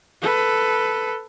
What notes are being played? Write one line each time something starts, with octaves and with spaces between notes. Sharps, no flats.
A4 B4